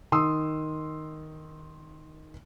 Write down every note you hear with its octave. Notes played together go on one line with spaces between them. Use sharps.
D#3 C6 D#6 E6